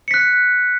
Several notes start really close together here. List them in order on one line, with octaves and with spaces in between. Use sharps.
C#7 B6 F#6